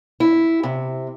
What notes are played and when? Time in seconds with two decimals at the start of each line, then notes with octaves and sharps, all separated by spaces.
0.20 E4
0.63 C3